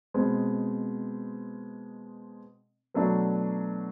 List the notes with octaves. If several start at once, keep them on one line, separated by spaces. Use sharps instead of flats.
B2 G#3 C4
B2 F#3 A3 D4